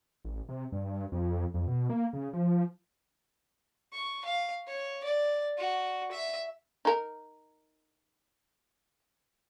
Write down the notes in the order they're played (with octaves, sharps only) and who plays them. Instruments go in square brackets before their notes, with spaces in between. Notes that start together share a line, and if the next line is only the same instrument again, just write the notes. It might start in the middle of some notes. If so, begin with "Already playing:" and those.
[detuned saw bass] A1
C3
G2
F2
F2
B2
A#3
C#3
F3
[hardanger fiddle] C#6
F5
C#5
D5
F#4
E5
[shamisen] D#4 A#4